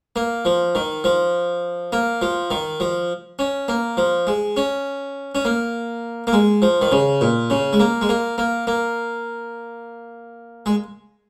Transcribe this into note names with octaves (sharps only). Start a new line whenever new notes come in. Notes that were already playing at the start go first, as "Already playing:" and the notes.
A#3
F3
D#3
F3
A#3
F3
D#3
F3
C#4
A#3
F3
G#3
C#4
C#4
A#3
A#3
G#3
F3
D#3
C#3
A#2
C#3
G#3
A#3
G#3
A#3
A#3
A#3
G#3